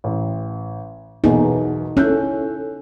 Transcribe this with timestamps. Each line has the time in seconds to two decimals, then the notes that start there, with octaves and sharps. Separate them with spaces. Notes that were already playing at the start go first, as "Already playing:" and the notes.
0.04 A1
1.24 B1 E2 B2 D#4 G#4
1.97 C#4 E4 A4 E6 F#6 G6